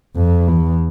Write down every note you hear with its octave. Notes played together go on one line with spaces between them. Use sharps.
F2
E2